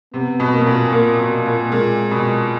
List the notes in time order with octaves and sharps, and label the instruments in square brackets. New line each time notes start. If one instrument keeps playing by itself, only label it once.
[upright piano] C3 [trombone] B3
[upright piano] B2
[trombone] A#3
[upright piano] B2
A#2
[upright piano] A#2 [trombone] A#3
[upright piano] B2
A#2
[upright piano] A#2 [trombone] G#3
[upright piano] B2